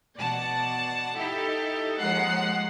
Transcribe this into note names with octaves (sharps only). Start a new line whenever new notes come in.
B2 D5 F#5 A5
D#4 E4 G4 A4
D#2 F3 G#3 F#5 C7